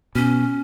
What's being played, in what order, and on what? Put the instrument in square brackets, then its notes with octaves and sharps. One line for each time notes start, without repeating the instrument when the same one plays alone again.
[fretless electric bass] B2 [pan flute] C#4